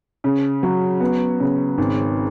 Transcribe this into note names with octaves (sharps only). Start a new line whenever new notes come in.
C#3
F#3
B3
C#3
G#1